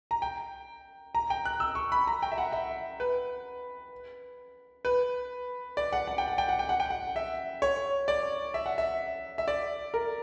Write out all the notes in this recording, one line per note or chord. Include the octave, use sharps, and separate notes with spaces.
A#5
G5
A#5
G5
F#6
E6
C#6
B5
A#5
G5
E5
F#5
E5
B4
B4
D5
F#5
F#5
G5
F#5
G5
F#5
G5
F#5
G5
F#5
E5
C#5
D5
E5
F#5
E5
E5
D5
A#4